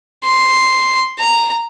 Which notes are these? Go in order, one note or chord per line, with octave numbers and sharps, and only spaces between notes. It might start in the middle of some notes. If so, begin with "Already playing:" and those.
C6
A#5